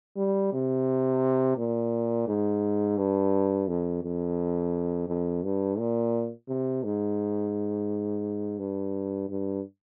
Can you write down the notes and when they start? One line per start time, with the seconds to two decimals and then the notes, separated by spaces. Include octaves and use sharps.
0.17 G3
0.52 C3
1.58 A#2
2.28 G#2
2.98 G2
3.68 F2
4.03 F2
5.08 F2
5.43 G2
5.79 A#2
6.48 C3
6.84 G#2
8.59 G2
9.29 G2